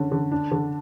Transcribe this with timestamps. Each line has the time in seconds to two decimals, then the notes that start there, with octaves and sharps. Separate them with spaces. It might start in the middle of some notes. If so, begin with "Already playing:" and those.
Already playing: D3 C#4
0.12 D3
0.31 D4
0.52 D3